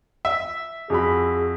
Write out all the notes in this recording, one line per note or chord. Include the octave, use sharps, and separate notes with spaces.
E5
F2 F#4 G#4 B5